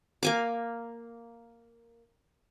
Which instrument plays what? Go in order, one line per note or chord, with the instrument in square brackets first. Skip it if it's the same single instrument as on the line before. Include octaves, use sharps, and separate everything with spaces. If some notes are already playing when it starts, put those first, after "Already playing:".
[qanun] A#3 G#5 D6